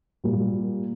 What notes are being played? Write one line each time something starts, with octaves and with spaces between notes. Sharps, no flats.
A#2 G3 A#3